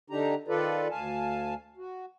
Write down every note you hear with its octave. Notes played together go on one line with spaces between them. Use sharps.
D3 D4 D#4 G4 A#5
D#3 F4 A4 B4 D5
D2 F5 G#5 A5
F#4